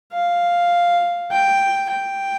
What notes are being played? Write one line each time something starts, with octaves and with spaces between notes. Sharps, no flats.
F5
G5
G5